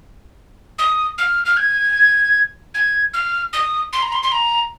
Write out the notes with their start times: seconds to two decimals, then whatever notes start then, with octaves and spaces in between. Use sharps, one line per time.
0.79 D#6
1.18 F6
1.45 F6
1.57 G#6
2.75 G#6
3.14 F6
3.53 D#6
3.93 C6
4.02 A#5
4.13 C6
4.23 C6
4.32 A#5